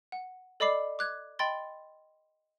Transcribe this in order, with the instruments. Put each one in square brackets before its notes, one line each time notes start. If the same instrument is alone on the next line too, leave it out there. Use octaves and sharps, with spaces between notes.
[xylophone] F#5
A4 D5 D#5 B5 D6 C7
D6 F#6 G#6
D#5 G5 B5 C6 A6 G7